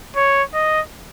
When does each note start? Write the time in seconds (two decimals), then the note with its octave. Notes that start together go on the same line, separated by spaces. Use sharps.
0.16 C#5
0.54 D#5